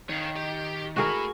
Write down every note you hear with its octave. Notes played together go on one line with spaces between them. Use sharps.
D#3 C#5 F5
G4
A3 E4 F#4 G#4 A#4